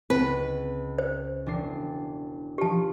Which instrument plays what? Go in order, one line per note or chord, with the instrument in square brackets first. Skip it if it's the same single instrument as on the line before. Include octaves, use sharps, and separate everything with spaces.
[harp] C#2 [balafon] C4 [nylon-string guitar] B4
[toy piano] C5
[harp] E1 D4 C7
[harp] F3 F4 [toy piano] G4 A5